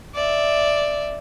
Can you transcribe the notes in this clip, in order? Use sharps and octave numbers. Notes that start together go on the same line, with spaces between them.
D5 E5